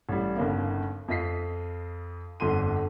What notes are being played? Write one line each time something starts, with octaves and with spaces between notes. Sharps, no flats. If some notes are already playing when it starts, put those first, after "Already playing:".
A1 G3
G1 D#2 C#3 A#3
F2 F4 D#5 B6 C7
G1 F2 D3 C6 D#7